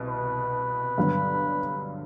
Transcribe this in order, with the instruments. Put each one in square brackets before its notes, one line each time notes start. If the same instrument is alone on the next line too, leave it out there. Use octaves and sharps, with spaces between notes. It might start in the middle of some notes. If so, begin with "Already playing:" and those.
Already playing: [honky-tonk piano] C2 B2
[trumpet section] B4
[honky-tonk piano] G2 D3 F#3 B3